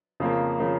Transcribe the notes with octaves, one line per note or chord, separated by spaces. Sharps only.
F2 C#3 F3 A#3
C#3 F3 A#3